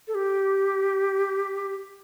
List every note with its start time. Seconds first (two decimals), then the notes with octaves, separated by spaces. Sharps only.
0.08 A4
0.15 G4